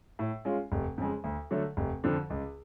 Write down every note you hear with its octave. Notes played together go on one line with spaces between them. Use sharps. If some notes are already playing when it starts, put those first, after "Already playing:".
A2
G#3 C#4 F4
F1
F2 C#3 G#3
D2
D3 F#3 A3
F1
F2 D3 F3
C#2